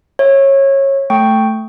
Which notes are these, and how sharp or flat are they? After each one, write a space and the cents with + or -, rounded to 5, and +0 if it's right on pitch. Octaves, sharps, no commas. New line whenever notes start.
C#5 -20 E5 +0
A3 +0 G5 +0 C#6 +0